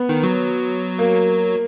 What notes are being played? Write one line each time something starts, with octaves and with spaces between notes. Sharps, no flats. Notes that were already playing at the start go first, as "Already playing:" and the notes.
Already playing: B3
D#3
F#3
A#3